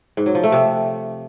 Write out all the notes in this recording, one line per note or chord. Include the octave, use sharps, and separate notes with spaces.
G#2
F#3
F3
A3
C3